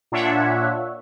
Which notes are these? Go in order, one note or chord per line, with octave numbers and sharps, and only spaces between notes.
A#2 D4 F4 C#5 E5 F#5